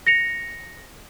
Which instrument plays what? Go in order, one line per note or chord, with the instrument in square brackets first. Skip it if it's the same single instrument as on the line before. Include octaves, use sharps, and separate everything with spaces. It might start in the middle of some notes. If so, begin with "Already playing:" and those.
[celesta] A#6 C#7 F7